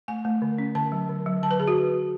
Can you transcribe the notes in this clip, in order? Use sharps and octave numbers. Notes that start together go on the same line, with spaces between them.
A3 G#5
A3
D3
C#4
D3 A5
F#3
D3
F#3
D3 A5
B4
D3 G#4
F#4